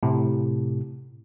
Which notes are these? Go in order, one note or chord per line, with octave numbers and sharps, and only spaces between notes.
A2 C3